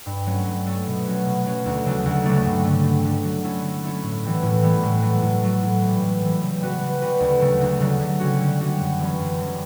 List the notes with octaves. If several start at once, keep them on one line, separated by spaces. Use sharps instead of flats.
G2
F#3 A3 C#4
G2
F#3 A3 C#4
B2
F#3 C#4 F#4
B2
F#3 C#4 F#4
D2
C#3 F#3 A3 D4
D2
C#3 F#3 A3 D4
G2
D3 A3
G2
D3 A3
F#3
A3 C#4 E4
F#3
A3 C#4 E4
A2
E3 G3 B3
A2
E3 G3 B3
A2
F#3 A3
A2
F#3 A3
A2
E3 G3
A2
E3 G3
C#3
G3 B3 F#4 B4
C#3
G3 B3 F#4 B4
D2
C#3 F#3 A3
D2
C#3 F#3 A3
D3
G3 C#4 F#4
D3
G3 C#4 F#4
F#2
E3 G3 C#4
F#2
E3 G3 C#4